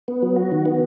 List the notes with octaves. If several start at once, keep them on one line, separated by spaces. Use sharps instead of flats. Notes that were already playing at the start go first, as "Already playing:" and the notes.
B3
F#3
F#4
D#3
B3